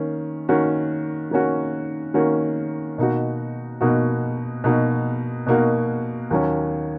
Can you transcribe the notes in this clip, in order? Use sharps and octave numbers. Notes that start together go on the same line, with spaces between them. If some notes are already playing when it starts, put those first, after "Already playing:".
Already playing: D#3 A#3 C#4
D#3 A#3 C#4 F#4
D#3 A#3 C#4 F#4
D#3 A#3 C#4 F#4
B2 A#3 D#4 F#4
B2 A#3 D#4 F#4
B2 A#3 D#4 F#4
B2 A#3 D#4 F#4
D#2 D#3 F#3 C#4